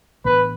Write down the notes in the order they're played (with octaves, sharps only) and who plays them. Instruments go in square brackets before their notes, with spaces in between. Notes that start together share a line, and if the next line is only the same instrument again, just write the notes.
[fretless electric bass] A2 E3 B3 D4 [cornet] B4